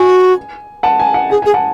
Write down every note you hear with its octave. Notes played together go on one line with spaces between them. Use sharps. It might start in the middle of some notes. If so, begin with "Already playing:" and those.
Already playing: F#4 G#5
F#5 A5
G#5
F#5
G#4 G#5
G#5
G#4
F#5 A5